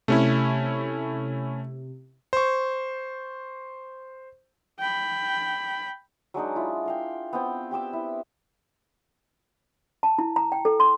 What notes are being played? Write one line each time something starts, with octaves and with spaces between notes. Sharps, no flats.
C3 A3 C#4 E4
C5 C#6
G5 B5
F#3 G#3 D4 D#4
E4 F4
A#4 F5 G5
B3 C4 G5
G4 G5 D6 E6
E4
A5
E4
A#5
G5
A4
C6